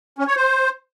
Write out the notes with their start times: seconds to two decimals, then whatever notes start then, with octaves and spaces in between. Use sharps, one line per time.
0.19 C#4
0.27 C#5
0.36 C5